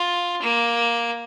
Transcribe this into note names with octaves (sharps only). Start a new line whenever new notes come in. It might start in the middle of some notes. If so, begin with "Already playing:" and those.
Already playing: F4
A#3